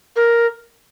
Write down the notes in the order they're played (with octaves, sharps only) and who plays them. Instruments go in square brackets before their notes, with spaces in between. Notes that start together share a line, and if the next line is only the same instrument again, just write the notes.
[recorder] A#4